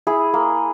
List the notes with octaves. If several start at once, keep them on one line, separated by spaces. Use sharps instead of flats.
E4 G#4
A#3